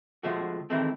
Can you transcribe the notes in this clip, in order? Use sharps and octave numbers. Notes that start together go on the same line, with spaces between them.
D3 F3 G#3 A3 F#4
D#3 E3 G#3 A3 C4